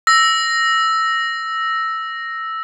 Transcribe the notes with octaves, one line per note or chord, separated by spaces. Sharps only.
E6 A#6